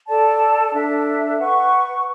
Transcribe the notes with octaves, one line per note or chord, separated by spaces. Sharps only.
A4 D5 A5
D4 A4 E5
B4 F#5 C#6